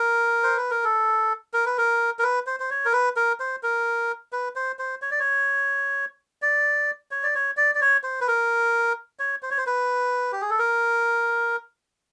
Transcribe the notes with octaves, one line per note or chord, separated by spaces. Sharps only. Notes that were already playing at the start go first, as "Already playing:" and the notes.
Already playing: A#4
C5
B4
A#4
A4
A#4
B4
A#4
A#4
B4
C5
C5
C#5
A#4
B4
A#4
C5
A#4
B4
C5
C5
C#5
D5
C#5
D5
C#5
D5
C#5
D5
D5
C#5
C5
B4
A#4
C#5
C5
C#5
C5
B4
G4
G#4
A4
A#4